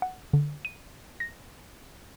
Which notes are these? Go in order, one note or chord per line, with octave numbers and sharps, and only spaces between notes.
F#5
D3
D#7
A#6